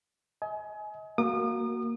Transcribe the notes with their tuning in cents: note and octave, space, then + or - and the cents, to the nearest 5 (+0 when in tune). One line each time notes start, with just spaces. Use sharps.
D#5 +35 G#5 +25
A#3 +0 F#4 +0 D#6 -35